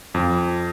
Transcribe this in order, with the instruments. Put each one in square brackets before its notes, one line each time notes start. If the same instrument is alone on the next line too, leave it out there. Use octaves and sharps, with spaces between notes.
[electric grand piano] F2